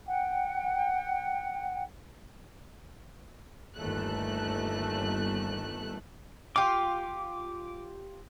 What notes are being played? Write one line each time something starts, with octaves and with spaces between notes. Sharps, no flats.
F#5 G5
G1 D#2 A3 F#6
F4 G4 D6